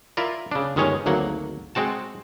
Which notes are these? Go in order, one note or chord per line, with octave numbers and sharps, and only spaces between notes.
E4 F4 A#4 D5
C#3 D4
G1 D#3 G#3 C#4 C#5 D#5
G#1 D2 F#3 A#3 F#5
G#3 C4 F#4 A5